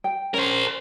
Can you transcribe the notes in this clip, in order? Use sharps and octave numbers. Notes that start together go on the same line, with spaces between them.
G5
C#4 A#4 C5